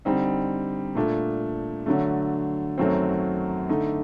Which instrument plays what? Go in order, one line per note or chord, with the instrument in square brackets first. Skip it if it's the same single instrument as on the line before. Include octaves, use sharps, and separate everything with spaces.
[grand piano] D3 G3 C4 D#4
A#2 A3 D4
D3 F#3 A3
F#2 D#3 F#3 A3 C4
D3 A3 D#4